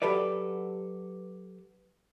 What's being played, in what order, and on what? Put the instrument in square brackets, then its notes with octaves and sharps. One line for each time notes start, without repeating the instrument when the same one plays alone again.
[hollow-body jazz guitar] F#3 G4 A4 B4 D5